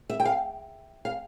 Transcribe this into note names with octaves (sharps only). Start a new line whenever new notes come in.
E5
G5
F5
F5